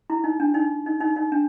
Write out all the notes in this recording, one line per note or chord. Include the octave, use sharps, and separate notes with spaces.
E4
D#4
D4
D#4
D#4
D#4
D#4
D4